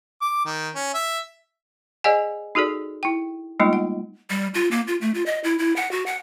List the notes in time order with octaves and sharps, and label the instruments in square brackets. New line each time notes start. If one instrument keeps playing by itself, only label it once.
[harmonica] D6
D#3
C#4
E5
[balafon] G#4 C5 D5 D#5 F#5 G#5
D#4 F#4 G#4 A4 D5
E4 G5
G3 G#3 A#3 B3 D#4 F4
F#5
[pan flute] G3
F4
A#3
F4
A3
F4
D#5
E4
E4
F#5
F#4
F#5